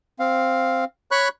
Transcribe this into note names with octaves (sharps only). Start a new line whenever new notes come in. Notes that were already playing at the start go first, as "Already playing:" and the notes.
C4 F5
C#5 B5 C#6 F#6